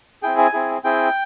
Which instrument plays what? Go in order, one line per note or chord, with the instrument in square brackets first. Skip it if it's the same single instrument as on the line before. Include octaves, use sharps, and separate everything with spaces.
[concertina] C4 E4 G#4 G5
G#5
C4 E4 G#4
C4 E4 G#4 G5